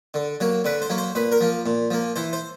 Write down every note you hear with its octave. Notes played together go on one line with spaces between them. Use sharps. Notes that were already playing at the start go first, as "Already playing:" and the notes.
D3
F#3 A#3
D3 B4
C5
F#3 A#3
C5
A#2 B4
A#4
F3 A#3
A#2
F3 A#3
E3 C5
C5